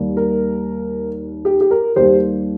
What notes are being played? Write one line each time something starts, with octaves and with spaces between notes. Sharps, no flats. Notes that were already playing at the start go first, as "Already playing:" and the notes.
Already playing: D#2 D#3 G3 A#3
A#4
G4
G4
A#4
D#2 D#3 G3 A#3 G4 C5